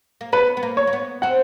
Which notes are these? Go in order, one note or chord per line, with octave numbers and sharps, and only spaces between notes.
A#3
B3 B4
B3
A#3
C#5
A#3
B3
C4 F#5